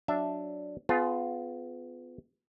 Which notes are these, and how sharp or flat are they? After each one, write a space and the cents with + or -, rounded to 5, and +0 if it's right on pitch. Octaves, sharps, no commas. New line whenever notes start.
F#3 +0 D4 +0 E5 +0
B3 +30 F4 +0 G#4 +35